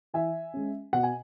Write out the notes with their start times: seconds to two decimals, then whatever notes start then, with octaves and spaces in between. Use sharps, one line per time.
0.14 E3 E5 G#5
0.54 G#3 C#4
0.93 B2 F#5
1.03 G#5